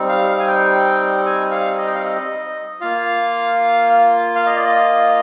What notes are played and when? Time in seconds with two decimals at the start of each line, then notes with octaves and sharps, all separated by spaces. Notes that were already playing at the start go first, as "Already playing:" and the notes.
Already playing: G3 C4 D#4
0.09 F5
0.28 F5
0.39 G#5
0.48 G5
1.26 G#5
1.51 F5
1.78 D#5
1.87 G5
1.95 F5
2.04 D#5
2.81 A#3 F4 F5
4.35 F5
4.46 D#5
4.55 D5
4.66 D#5